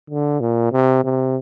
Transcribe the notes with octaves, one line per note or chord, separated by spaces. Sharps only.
D3
A#2
C3
C3